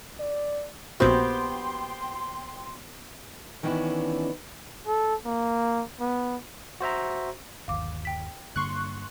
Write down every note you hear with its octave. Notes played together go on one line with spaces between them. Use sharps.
D5
A#1 A#2 B3 C4 F#4 G4 G5 C6
D#3 E3 B3 C#4 D4 E4
A4
A#3
B3
F#4 C5 E5 A#5
G1 D#2 F5 D6
G5 B6
G2 D3 A#3 C6 C#6 F#6